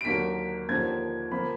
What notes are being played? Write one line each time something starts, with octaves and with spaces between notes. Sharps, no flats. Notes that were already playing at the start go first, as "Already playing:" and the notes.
D7
D#2 D3 F#3 A#3 B6
D#2 D3 F3 A#3 G#6
F3 A#3 B5